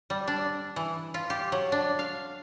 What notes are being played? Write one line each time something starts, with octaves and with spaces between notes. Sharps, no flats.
G3
D4
E3
F4
G4
F#3
D4
F5